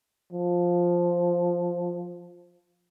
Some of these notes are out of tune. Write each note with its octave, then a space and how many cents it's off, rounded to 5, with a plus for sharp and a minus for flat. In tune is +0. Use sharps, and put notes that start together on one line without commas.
F3 +5